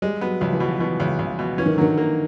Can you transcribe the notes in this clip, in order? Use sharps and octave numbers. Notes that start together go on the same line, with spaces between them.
G3 G#3
F#3 B3
C#2 F3
E3
B2 F3
B2 E3
C#2
C#2
B2
E3 C#4
D#3
D3
D#3 F#3
A#3